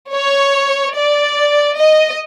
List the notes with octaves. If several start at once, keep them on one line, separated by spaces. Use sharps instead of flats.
C#5
D5
D#5